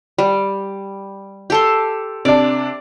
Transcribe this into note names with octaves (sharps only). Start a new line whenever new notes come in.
G3
G4 A4 C6
C3 D4 D5